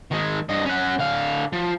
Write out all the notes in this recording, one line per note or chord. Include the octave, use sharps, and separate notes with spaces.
D#3 G#3
G2 D#5
C#4 F#5
D3 F5
F3